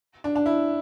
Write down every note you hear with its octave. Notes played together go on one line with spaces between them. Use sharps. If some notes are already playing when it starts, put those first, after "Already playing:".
D4
D4
E4